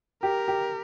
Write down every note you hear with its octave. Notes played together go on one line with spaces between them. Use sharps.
G4 A#4
G4